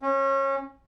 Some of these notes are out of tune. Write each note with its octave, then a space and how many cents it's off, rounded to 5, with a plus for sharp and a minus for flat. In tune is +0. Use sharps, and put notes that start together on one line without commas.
C#4 -25